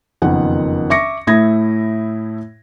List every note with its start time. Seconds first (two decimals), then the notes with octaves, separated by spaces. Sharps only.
0.22 F#1 F2 D#3 B3 F#5
0.90 E5 C#6 D6 A#6 C#7
1.27 A2 A3 E4 D#6 G#6 A#6